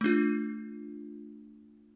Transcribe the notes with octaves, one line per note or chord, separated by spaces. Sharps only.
A3 D4 F4